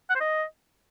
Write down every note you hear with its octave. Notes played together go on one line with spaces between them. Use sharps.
F#5
C5
D#5